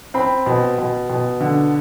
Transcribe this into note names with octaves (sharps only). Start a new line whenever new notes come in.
C4 B5
B2
B2
B2
D3